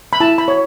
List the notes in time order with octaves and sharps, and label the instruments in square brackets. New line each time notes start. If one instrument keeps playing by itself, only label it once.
[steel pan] B5
E4 A5
B5
C#5